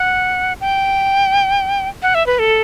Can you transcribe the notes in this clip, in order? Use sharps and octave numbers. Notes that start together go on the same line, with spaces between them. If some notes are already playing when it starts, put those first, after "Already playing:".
Already playing: F#5
G5
F#5
E5
B4
A4